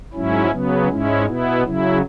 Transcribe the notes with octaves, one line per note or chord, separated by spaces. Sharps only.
G#2 F#3 C#4 E4
C#3 F#3 B3
G#2 G#3 C#4 E4
B2 B3 E4
C#3 F#3 E4